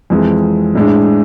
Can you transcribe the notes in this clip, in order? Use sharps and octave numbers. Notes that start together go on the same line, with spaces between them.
F2 E3 G#3
A2 G#3 D4